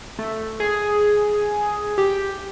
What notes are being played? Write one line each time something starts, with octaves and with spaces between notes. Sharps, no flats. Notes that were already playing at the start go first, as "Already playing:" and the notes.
A3
G#4
G4